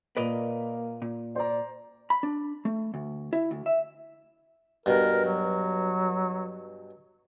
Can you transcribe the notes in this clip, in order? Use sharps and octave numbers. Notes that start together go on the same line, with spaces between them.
A#2 A#3 A#4 B4 D5 D#5 F7
A#2
C5 D5 A#5
B5
D4
A3
D2
E4
D2
E5
G2 B2 A#4
F#3